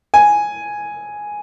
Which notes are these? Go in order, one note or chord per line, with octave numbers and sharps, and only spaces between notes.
G#5